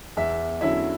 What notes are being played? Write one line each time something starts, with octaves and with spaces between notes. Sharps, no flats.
E2 E5
D3 F#3 C#4 E4 E5